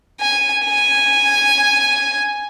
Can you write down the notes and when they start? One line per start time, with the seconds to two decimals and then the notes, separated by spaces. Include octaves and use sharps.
0.21 G#5
0.65 G#5